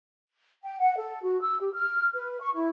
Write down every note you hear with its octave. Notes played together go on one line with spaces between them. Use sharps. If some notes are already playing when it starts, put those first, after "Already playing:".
G5
F#5
A4
F#4
E6
G4
F6
B4
C#6
E4